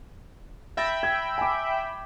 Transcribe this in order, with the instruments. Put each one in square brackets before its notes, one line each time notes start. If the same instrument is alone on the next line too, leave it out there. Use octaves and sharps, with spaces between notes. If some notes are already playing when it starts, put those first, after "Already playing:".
[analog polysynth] E5 G5 B5 [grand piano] A6 A#6
[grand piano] G#6
G#5 D6